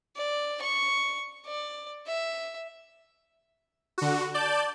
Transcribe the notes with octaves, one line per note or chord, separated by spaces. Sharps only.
D5
C#6
D5
E5
D3 F#4
D5 A5 G6